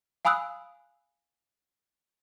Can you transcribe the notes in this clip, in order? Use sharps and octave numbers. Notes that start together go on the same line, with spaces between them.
F5 G#5 B5 D#6 E6 F#6